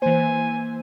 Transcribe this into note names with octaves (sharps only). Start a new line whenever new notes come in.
E3 A#3 C5 G#5